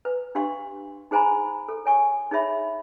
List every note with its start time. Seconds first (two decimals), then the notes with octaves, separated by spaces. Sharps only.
0.05 B4
0.35 D4 G4 F5 C6 C#6
1.11 D#4 G#4 C5 G#5 A#5 B5
1.68 A4
1.86 C#5 G#5 C#6
2.31 D#4 G#4 C#5 E5 B5